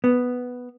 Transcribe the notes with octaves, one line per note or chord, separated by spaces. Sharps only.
B3